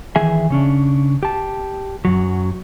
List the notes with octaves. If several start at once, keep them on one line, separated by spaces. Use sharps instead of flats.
D#3 E3 G#4 E5 G#5
C#3 C#4 D4
G4 A5
F#2 F#3